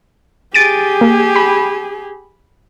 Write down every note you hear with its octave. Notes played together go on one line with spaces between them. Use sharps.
G4 G#4 A6 D7 D#7
A#3
B5